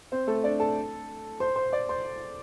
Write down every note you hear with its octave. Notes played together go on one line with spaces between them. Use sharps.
C4 C5
A3 A4
D4 D5
A4 A5
C5 C6
C5 C6
D5 D6
C5 C6